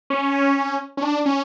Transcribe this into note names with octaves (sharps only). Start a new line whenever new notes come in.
C#4
C#4
D4
C#4